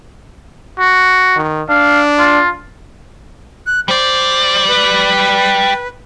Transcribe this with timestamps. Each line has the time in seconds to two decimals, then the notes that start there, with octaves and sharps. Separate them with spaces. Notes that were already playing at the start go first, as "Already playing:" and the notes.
0.80 F#4
1.36 D#3
1.69 D4 F5
2.19 F4
3.66 F#6
3.88 G3 C5 D5
4.68 B4